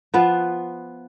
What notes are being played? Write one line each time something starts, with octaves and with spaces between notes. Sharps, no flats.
F3 B3 F4 B4